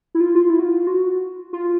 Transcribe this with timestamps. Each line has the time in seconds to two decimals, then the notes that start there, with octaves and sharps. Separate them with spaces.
0.15 E4
0.21 F4
0.35 F4
0.50 E4
0.59 F#4
0.65 F4
0.87 F#4
1.53 F4